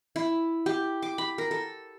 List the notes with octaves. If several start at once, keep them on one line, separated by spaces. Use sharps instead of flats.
E4
G4
D6
B5
A#4
A4